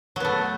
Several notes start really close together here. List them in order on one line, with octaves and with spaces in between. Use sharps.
F#3 B3 A3